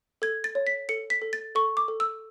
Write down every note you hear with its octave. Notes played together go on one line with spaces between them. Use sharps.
A4 G#6
A6
C#5
B6
A4 C#7
B6
A4
A6
A4 C#6
D6
A4
E6